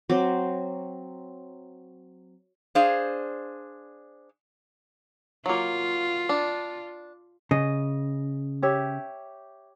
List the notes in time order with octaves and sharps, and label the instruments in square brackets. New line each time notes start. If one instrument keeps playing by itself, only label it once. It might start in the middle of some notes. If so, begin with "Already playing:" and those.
[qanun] F#3 C4 C5 D6
[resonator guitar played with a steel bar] D4 G#4 C5 F5
[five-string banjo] F#3 A#3 [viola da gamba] F4
[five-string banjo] D4
[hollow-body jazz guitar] C#3 [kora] D#5
[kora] G4 C#5 E5